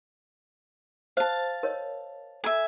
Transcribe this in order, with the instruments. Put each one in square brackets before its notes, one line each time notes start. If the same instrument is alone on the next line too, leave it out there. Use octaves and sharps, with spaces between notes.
[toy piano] C5 [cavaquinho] F5 A5
[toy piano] A#4 C#5 D#5
[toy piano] A4 A#5 [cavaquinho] E5 G#5